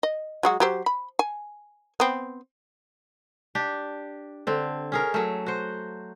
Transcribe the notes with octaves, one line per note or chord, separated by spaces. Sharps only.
D#5
F#3 G#3 F#4
F#3 G4 C5
B5
G#5
B3 C4
D4 G4
D3 C4
C#4 G#4 A#4
F#3 A3
F#4 C5